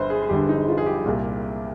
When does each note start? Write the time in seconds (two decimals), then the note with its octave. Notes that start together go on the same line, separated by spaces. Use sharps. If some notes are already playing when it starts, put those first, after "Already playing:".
Already playing: G1 G2 D3 B4 C5
0.10 G#4
0.23 G#4
0.29 G1 G2 D3 G4
0.49 D#4
0.68 F4
0.78 G#4
0.86 G4
1.06 C2 A#2